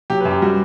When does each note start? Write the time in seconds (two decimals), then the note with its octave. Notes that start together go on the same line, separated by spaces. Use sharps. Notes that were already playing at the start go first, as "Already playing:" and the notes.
0.10 F#3 G4
0.21 B4
0.25 F#2
0.31 G4
0.42 G3 F#4